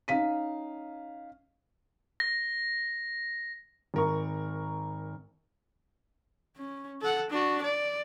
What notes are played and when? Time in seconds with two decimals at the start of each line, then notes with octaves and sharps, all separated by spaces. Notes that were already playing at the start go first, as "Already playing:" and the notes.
0.08 C#4 D#4 F5 B6 D#7
2.20 A#6
3.94 G#1 A#4 C#6
6.56 C#4
7.01 A4 F#5
7.31 D4 F#4
7.62 D5